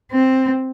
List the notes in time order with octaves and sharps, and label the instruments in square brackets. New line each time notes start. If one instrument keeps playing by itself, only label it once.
[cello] C4